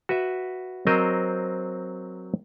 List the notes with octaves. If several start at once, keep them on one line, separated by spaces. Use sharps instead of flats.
F#4 B4 E5
F#3 C4 A#4 C5 D#5